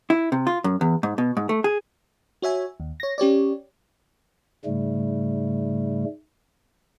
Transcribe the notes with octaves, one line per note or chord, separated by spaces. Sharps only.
E4
C3
F4
F#2
E2
G#2
B2
G#2
A3
G#4
F#4 C#5 E5 G#5
D#2
C#5 A#6
C#4 G4 C#5 D5
G#2 C#3 G3 A3